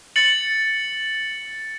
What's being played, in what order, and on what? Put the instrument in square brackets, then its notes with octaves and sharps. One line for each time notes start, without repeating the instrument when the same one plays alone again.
[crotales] A6 C#7 F#7